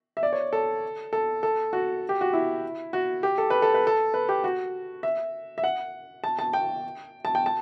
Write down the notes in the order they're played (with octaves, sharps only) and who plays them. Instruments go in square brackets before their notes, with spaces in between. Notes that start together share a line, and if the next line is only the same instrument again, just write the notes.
[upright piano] E5
D5
C#5
A4
A4
A4
F#4
G4
F#4
E4
F#4
G4
A4
B4
A4
B4
A4
B4
G4
F#4
E5
E5
F#5
A5
A5
G5
A5
G5
A5